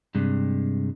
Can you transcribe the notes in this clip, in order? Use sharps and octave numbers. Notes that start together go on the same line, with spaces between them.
G2 C3 G#3